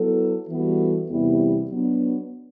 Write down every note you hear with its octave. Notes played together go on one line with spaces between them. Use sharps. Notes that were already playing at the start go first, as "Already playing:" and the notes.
Already playing: F#3 B3 E4 A4
E3 G3 B3 F#4 A4
E2 C3 G3 B3 E4
F#3 B3 D4